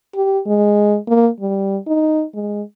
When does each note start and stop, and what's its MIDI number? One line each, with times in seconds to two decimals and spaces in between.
0.15 0.40 67
0.47 0.97 56
1.08 1.29 58
1.40 1.78 55
1.87 2.24 63
2.35 2.62 56